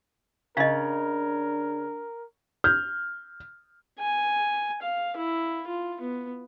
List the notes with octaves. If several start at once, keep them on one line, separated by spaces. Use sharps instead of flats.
C#3 D4 A#4 D#5 F5
F6 G6
G#5
F5
E4
F4
B3